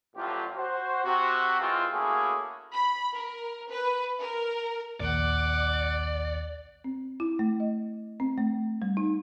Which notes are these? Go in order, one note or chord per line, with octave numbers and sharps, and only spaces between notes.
A1 A2 F3 F#3 F4 G4
F#4 C5
C3 F#4
E3 G#3 C4 F4
A3 A#3 C#4 E4 F#4 G#4
B5
A#4
B4
A#4
A#1 D#2 D5 F#5 D6
C4
E4
A3
D#5
C4
A3
G3
D#4